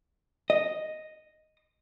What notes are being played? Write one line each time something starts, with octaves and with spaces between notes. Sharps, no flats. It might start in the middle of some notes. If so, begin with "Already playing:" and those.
D#5